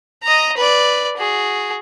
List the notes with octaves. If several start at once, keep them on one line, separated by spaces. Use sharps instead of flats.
D#5 A#5
B4 D5
F#4 G#4